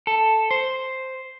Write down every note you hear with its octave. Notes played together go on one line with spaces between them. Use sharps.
A4
C5